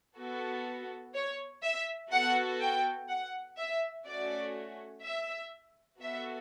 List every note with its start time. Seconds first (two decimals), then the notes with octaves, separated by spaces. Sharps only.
0.17 B3 F#4 A4
1.14 C#5
1.63 E5
2.11 B3 F#4 A4 F#5
2.60 G5
3.09 F#5
3.58 E5
4.06 A3 C#4 F#4 D5
5.04 E5
6.00 B3 F#4 A4 E5